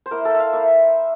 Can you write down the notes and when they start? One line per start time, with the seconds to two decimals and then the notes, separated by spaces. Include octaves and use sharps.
0.06 C5
0.11 A#3 E4 A#4
0.25 A4
0.34 E5 F5
0.53 A#3 E4 E5